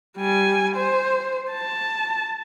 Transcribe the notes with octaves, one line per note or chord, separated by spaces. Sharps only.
G3 G#5
C5
A5